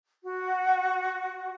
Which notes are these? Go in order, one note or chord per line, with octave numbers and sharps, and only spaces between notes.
F#4